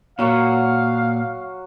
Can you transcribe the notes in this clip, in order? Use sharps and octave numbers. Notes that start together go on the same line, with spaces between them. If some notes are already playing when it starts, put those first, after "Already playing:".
A#2 F#3 F5 F#5 C#6